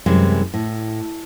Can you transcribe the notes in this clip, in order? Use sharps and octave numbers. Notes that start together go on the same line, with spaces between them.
F#2 C3 E3 G3 G#3
A2